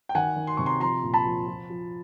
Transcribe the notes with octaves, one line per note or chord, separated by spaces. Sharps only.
G5
D#3 F#5 G#5
D#3
C6
C3 C#6
A#5 C6
F3 A#5 C6
A#2
A5 B5
F3
F3
F3